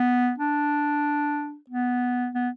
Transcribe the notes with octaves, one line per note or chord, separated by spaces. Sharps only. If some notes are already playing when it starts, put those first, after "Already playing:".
Already playing: B3
D4
B3
B3